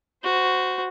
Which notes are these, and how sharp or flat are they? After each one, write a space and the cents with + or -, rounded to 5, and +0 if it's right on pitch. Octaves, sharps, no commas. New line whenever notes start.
F#4 +0 C5 -15